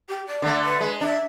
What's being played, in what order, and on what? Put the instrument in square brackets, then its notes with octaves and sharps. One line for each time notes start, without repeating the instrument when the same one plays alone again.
[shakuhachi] G4
D5
[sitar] D3 A3
[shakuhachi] B4
[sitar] G#3
[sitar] D4 [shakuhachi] E5